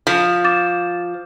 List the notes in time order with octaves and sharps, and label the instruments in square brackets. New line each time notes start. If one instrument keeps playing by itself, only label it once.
[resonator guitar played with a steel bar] F3
[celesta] D6 A6 E7